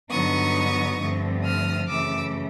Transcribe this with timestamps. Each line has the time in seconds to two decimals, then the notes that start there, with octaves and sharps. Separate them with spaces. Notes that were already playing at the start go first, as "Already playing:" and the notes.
0.10 G2 D3 F#3 B3 D#4 C#6 D#6
0.99 G2 D3 F3 A3 C4
1.44 D#6 F6
1.88 F#2 C#3 E3 A3 D6 E6